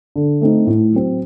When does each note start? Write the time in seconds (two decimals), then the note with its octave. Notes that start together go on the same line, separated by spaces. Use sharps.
0.16 D3
0.41 A3 C4 D#4
0.67 A2
0.93 F#3 C4